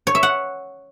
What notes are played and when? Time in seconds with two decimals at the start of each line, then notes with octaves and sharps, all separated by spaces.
0.07 C#5
0.15 E5
0.23 F#5